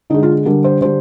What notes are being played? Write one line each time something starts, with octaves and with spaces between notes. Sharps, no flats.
D3 G#3 D#4
F4
D3 G3 A#4
C5
D3 G3 C5